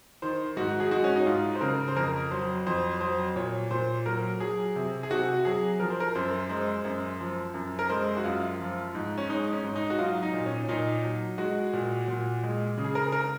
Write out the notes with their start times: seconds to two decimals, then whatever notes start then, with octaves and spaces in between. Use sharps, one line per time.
0.22 D#3 C5
0.57 G#2 F#4
0.80 G#4
0.91 G#3 F#4
1.04 C#4
1.16 D#4
1.27 G#2 F4
1.55 C5
1.61 C#3 A#4
1.88 C5
1.96 F2 A#4
2.31 F#3 C5
2.67 F2 C5
3.01 F#3 C5
3.36 A#2 C#5
3.71 A#2 C5
4.06 F#3 A#4
4.40 F#3 G#4
4.76 C3
5.03 G#4
5.10 C3 F#4
5.45 F#3 G#4
5.80 F3 A#4
5.90 C5
6.00 A#4
6.15 F#2 C5
6.49 G#3 C5
6.85 F#2
7.20 F3
7.54 F#2
7.79 A#4
7.89 G#3 C5
8.17 F#4
8.24 F#2 F4
8.60 F3
8.95 G#2
9.18 C#4
9.30 G#3 D#4
9.53 C#4
9.64 G#2
9.76 D#4
9.90 F#4
9.99 F#3 F4
10.23 D#4
10.34 A#2
10.46 C#4
10.68 A#2 D#4
11.04 F#3
11.38 G#3 F#4
11.73 A#2
12.08 A#2
12.43 G#3
12.78 C#3
12.84 G#4
12.95 A#4
13.12 A#4